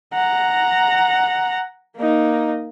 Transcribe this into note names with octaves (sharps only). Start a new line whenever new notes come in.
F#5 A#5
A#3 D#4